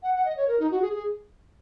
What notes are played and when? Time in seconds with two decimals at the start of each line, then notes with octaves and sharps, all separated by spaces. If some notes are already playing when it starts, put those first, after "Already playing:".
0.03 F#5
0.14 F#5
0.25 D#5
0.37 C#5
0.48 A#4
0.59 D#4
0.71 F#4
0.82 G#4
0.94 G#4